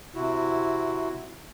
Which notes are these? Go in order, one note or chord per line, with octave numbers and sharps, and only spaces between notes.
C3 E4 F#4